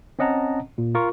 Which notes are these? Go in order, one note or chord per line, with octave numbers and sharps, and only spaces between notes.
C4 C#4 D#5 F#5 A5 A#5
A#2
F4 A#4 C#6